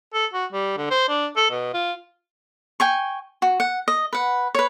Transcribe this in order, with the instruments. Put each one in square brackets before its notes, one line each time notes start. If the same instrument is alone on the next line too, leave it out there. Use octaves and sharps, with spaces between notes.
[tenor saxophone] A4
F#4
G3
D3
C5
D4
A4
B2
F4
[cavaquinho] G5 G#5 C#6
F#4
F#5
D#5
B4 F#5
B4 C#5